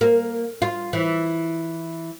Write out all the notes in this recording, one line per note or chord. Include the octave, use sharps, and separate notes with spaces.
A#3
F4
E3